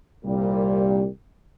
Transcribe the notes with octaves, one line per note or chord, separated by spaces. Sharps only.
C2 A#2 G3